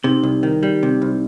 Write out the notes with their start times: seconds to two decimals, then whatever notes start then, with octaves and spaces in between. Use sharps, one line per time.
0.04 C3 D#4
0.23 C2
0.43 D#3
0.63 G3
0.83 C3
1.02 C2